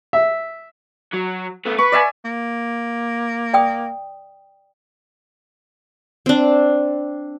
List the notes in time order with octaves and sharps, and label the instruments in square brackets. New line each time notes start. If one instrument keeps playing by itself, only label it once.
[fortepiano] E5
[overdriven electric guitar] F#3
A3 B3
[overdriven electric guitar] B4 [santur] C#6
[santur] D5 E5 G#5
[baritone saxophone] A#3
[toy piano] D5 G5 D#6
[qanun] C4 D4